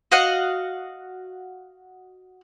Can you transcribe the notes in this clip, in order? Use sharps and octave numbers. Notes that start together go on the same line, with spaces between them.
F#4 D#5 F5 F#5